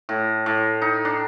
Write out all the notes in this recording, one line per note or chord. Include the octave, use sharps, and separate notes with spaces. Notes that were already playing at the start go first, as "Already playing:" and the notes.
A2
A2
D#4
D4